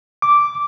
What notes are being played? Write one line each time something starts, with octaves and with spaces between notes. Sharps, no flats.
D6